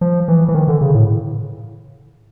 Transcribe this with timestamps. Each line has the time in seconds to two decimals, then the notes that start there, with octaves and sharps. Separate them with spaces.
0.01 F3
0.28 E3
0.48 E3
0.55 D#3
0.68 D3
0.81 C#3
0.95 A2